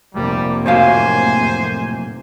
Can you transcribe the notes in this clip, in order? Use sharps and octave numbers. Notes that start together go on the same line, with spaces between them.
F1 C3 G3 A#3
A2 F#3 C5 F5 G#5